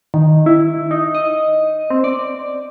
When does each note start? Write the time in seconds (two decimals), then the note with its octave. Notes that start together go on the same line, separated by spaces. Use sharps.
0.14 D#3
0.46 E4
0.91 D#4
1.15 D#5
1.90 C4
2.04 D5